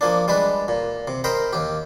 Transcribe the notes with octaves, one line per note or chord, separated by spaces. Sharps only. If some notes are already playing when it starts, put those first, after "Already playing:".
F3 A#3 D4
G3 G#3 D4 B4
A#2
C3
A#4 C5 D#5 G5 B5
D#2 G4